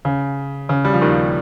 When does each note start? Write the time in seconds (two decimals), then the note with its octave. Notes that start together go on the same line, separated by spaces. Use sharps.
0.05 C#3
0.69 C#3
0.85 G3
0.93 F3
1.02 D#2 D#3